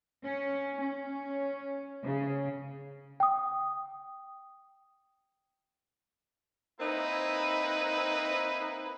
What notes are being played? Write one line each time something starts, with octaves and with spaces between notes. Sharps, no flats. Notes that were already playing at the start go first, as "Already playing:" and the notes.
C#4
C#4
C#3
G5 D#6
A#3 C4 D#4 E4 B4